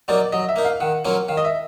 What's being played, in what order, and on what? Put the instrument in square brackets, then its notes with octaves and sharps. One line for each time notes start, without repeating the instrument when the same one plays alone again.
[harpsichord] F#3 A#3 D#4 [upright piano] D5
[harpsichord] F#3 [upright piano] D#5
[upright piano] E5
[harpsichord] A#3 D#4
[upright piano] F5
[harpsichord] D#3 [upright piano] F#5
[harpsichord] F#3 A#3 C#4 F4
[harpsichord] D#3 [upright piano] F5
[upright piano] D#5
E5